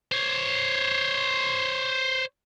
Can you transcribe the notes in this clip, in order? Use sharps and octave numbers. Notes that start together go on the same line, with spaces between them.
C5 C#5